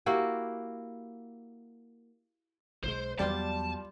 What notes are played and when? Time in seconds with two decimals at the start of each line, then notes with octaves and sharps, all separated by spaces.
0.06 A#3 E4 F#4 G4
2.84 B1 E3 G#3 C5
3.19 E2 F#3 G3 B3 F4 C5 D5 A5